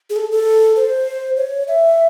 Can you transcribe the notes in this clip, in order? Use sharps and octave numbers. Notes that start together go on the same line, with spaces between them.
G#4
A4
A4
C5
C#5
E5